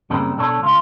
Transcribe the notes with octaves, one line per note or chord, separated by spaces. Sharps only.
F#2 C#3 G3 A#3 C4
B1 D4 A4 C#5
C#2 F4